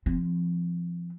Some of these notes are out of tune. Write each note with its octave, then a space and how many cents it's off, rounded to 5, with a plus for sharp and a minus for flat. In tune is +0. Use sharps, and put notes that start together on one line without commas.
F3 -20 C4 +0